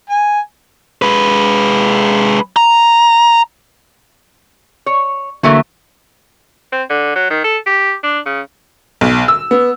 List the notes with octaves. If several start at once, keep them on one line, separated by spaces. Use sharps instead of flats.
G#5
G#3 B4
A#5
C#5
D3 E3 F#3 A3 A#3 E5
C4
D3
F#3
D#3
A4
G4
D4
C#3
B1
E6
B3